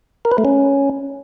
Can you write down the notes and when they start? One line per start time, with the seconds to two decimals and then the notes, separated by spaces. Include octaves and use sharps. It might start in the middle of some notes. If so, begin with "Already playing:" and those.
0.25 A#4
0.32 B4
0.38 A3
0.45 C#4